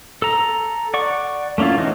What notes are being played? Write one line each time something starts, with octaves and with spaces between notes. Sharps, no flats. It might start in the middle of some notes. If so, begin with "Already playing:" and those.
A4 A#5
D5 F#5 C#6
A3 A#3 C#4 E4 F4
E3 C#4 D#4 F#4